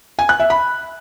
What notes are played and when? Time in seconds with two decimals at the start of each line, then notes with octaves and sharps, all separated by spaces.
0.19 G#5
0.29 F#6
0.40 E5
0.50 B5